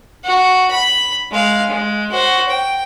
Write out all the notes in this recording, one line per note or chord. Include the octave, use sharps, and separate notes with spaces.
F#4
B5
G#3 F5
G#3
F#4 C5
G5